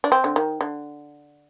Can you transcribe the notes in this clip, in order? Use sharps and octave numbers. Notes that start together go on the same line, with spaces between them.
D4
C4
D3
D#3
D3